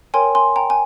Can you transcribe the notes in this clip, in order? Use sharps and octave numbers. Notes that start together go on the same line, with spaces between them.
A#4 C#5 G5 G#5 C6
G#5 C6
G5 A#5
G#5